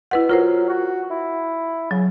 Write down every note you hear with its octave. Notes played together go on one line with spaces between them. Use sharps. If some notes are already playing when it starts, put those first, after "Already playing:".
B2 E4 B4 F#5
F#3 F4 A#4 C5
F#4
E4
C#3 F#3